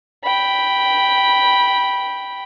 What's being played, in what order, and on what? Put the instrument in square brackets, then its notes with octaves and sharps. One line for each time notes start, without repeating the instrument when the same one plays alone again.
[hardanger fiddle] G5 B5